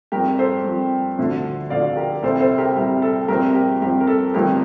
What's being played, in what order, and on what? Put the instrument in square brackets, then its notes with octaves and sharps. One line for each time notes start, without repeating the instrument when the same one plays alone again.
[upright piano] G2 F3 C4 G4 A#4
A4 C5
G2 F3 C4
D2 D3 F3 A3
D2 D3 F3 A3 D5 F5
G4 A#4
C2 C3 G3 A4 C5
A4 C5
G4 A#4
C2 C3 G3 G4
A4
G2 F3 C4 G4 A#4
G4 A#4
G2 F3 C4 G4
A#4
A4
G1 G2 F3 A3 C4 G4 A#4